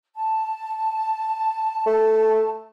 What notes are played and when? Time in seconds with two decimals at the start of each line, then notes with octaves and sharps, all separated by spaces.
0.15 A5
1.86 A3